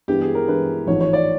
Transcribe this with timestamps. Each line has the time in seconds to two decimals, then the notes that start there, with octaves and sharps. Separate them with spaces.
0.08 G2 E3 G#3 B3 G4
0.22 G#4
0.35 A#4
0.48 G2 E3 G#3 B3 B4
0.87 A1 G#2 F3 C#5
1.01 C#5
1.13 D5